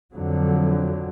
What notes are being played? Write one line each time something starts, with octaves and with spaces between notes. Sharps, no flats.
F2 D3 F#3